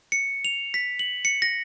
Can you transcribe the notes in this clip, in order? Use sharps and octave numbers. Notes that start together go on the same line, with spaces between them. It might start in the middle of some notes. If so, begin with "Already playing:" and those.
C#7
F7
B6
F#7
C#7
A#6